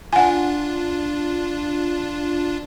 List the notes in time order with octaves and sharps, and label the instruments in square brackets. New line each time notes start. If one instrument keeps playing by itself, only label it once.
[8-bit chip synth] D4 F4 [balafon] F#5 G#5